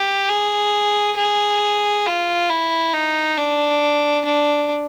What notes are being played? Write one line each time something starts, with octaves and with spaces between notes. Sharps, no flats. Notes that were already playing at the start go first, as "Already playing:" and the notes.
Already playing: G4
G#4
G#4
F4
E4
D#4
D4
D4